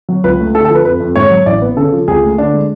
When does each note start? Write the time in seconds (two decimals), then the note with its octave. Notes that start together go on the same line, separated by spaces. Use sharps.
0.09 F#3
0.24 C#2 B4
0.39 A3
0.55 D3 A4
0.65 A4
0.70 F3 B4
0.85 F2 B4
1.00 F2
1.16 G#2 C#5
1.31 F#3
1.46 A1 D5
1.62 B3
1.77 C#3 A4
1.93 F3
2.08 C#2 G#4
2.23 A3
2.38 D3 D4
2.53 G#3